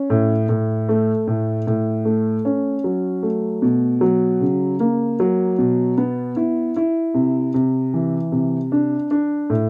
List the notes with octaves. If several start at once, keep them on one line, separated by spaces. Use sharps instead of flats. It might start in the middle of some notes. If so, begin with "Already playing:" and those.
Already playing: C#4
A2
A2
A3
A2
A2
A3
C#4
F#3
A3
B2
F#3
C#3
A#3
F#3
B2
B3
E4
E4
C3
C3
E3
C3
D4
D4
A2